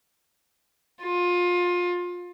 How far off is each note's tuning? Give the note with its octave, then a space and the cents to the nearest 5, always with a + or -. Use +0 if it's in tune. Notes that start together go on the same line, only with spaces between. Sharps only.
F4 +25